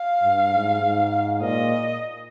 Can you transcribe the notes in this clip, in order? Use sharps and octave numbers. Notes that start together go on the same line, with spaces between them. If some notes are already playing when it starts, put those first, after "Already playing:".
Already playing: F5
G2
G#2
G#2
A#2 D#5